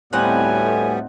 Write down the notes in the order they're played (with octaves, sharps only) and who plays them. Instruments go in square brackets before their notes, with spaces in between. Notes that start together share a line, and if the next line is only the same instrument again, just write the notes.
[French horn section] D2 A2 [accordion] G3 B3 [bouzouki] C4 D#4 F#5 [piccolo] G#5